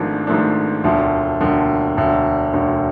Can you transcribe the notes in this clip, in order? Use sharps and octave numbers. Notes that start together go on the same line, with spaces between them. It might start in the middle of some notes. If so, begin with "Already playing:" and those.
Already playing: G#1 G#2 F3 A3 D4
G#1 G#2 F3 A3 D4
E1 D2 D3 F3
E1 D2 D3 F3
E1 D2 D3
E1 D2 D3